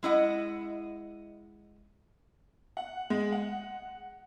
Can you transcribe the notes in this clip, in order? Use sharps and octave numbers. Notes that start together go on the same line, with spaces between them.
G#3 E4 D#5 F#5
F#5
G#3
F#5